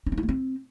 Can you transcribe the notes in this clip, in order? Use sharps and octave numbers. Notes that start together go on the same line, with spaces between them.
C#4
C4
E4
A#3
C4